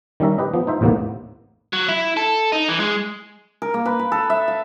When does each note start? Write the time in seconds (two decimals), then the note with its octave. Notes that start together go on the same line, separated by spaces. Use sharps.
0.20 D#3 G3 C#4 E5 A#5
0.38 G4 B4 D#5
0.54 F3 B3
0.67 D#4 C5 E5
0.81 A1 D#2 A2 C3 A#3 B3
1.73 F#3
1.89 E4
2.17 A4
2.52 D#4
2.69 E3
2.80 G#3
3.62 A#4
3.74 A#3
3.85 B4
3.99 B4
4.12 A4
4.30 E5
4.48 F5